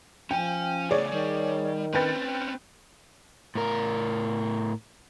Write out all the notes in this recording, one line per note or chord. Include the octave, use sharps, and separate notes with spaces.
F3 C#4 G5 G#5
A2 C#3 G#4 C#5 D5
D#3 G3
C4 C#4 B4 G5 A6
A2 A#4